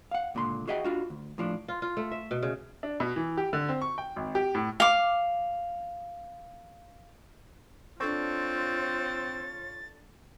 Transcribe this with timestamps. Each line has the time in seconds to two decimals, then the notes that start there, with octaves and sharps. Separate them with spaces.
0.11 F5 F#5
0.35 C#2 A#2 D3 B5 C6
0.68 F#4 G#4 D#5 E5 F#5 G5
0.84 D4 F4 F#4
1.10 D2
1.38 A2 F3 D4
1.68 F4
1.82 F4
1.97 A3
2.12 E5
2.31 B2
2.43 C#3
2.83 D4
3.00 B2
3.16 E3
3.37 G4
3.53 D3
3.69 C4
3.82 C#6
3.98 G5
4.16 G#1
4.35 G4
4.55 A2
4.80 F5 D6
8.00 C4 D4 F4 A4 C#5 C#6 A6